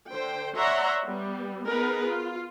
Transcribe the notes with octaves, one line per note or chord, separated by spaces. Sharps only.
D3 C5 G5
C#5 D5 E5 F#5 A#5 C6
G3 B3
B3 D#4 G#4 A#4 B4
F4